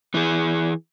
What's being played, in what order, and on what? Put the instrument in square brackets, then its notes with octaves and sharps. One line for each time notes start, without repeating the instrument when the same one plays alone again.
[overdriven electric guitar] E3 G#4